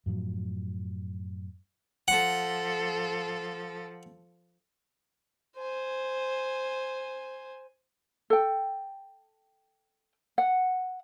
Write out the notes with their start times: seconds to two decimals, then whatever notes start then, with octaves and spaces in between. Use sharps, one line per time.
0.06 F#2 A2 F3 F#3
2.08 F3 A4 F#5
5.56 C5 G#5
8.30 A4 G5
10.38 F#5